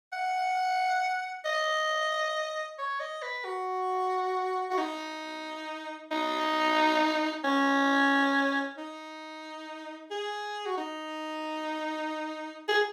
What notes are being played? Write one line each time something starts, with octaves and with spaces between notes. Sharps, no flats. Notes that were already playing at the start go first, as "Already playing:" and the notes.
F#5
D#5
C#5
D#5
B4
F#4
F#4
D#4
D#4
C#4
D#4
G#4
F#4
D#4
G#4